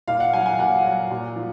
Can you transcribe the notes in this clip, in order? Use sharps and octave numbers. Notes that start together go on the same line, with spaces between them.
A#2 F5
F#5
F#3 G#5
G#5
A#2 F#5
F#3
A#2
F3